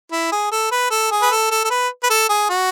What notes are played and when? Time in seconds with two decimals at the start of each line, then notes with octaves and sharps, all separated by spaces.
0.12 E4
0.32 G#4
0.51 A4
0.71 B4
0.91 A4
1.11 G#4
1.22 B4
1.31 A4
1.50 A4
1.64 A4
1.70 B4
2.03 B4
2.10 A4
2.29 G#4
2.49 F#4